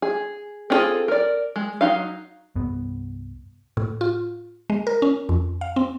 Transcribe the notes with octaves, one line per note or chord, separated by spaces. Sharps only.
G#4
C4 D4 F4 G#4 A4
A#4 D5
G#3
F#3 D#4 F5
C2 G2 B3
A2
F4
G#3
A#4
C#4
F2
F5
C4